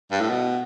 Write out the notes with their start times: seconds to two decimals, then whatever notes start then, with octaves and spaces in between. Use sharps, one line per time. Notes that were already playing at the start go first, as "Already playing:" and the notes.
0.12 G2
0.21 A2
0.29 B2